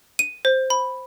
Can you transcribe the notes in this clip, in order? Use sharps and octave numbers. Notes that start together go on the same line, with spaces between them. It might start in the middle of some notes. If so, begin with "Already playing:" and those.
D#7
C5
B5